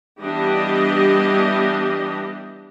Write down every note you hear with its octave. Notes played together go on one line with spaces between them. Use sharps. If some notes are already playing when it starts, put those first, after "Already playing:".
E3 G3 B3 D4 G4 D#5